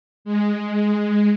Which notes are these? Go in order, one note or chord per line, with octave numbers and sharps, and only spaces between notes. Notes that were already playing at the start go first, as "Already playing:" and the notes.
G#3